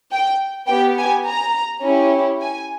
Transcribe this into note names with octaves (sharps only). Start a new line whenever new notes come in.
G5
B3 G4 G5
G#5
A#5
C#4 E4 G4
G#5